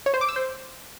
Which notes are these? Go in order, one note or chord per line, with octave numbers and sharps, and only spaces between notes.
C#5
C5
D6
E6
C5